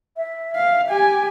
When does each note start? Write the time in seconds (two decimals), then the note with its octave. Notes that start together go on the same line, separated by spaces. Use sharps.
0.17 E5
0.56 F5
0.88 G4 G#5